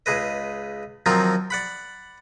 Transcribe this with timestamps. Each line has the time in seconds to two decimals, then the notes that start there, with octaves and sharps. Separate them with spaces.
0.06 C#2 G#4 B4 D#5
1.06 D#3 F3 F#3 C4 D#4 F4
1.50 D5 F#5 B5